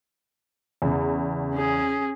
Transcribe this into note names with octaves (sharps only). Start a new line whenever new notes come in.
E2 C#3
C#4 G#4